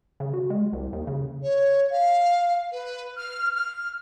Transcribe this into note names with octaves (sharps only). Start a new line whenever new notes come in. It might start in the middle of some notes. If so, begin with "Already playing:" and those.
C#3
F#4
G#3
C2
D#2
C#3
C#5
F5
B4
F6
F6